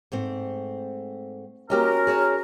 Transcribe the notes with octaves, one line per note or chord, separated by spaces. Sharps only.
G#2 A3 C4
A#3 C#4 F#4 G4 A#4 D#5
G#4 C#5 A5